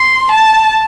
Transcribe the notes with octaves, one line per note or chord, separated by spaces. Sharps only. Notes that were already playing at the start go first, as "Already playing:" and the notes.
Already playing: C6
A5